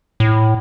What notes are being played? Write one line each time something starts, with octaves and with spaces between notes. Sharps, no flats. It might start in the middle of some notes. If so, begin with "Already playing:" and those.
A2